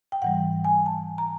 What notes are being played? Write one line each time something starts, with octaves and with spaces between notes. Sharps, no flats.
G5
G#2 E3 G3 F#5
G#5
A5
A#5